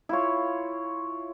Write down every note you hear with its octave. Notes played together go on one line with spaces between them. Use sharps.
E4 F4 C#5